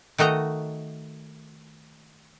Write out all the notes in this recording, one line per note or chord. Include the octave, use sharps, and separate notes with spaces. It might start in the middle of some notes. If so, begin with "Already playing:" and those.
D#3 A3 F#4 D#5 A#5